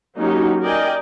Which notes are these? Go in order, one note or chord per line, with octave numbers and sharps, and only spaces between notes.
F#3 A#3 C#4 D#4 F#4 G4
A#4 D5 D#5 G5 G#5